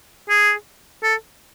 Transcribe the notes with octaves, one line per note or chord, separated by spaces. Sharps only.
G#4
A4